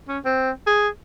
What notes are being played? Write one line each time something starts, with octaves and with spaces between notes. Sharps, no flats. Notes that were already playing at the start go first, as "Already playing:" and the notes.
C#4
C4
G#4